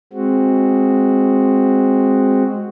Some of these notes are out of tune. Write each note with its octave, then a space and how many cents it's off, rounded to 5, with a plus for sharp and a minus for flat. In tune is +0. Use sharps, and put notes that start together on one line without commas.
G#3 +0 C4 +5 F#4 +0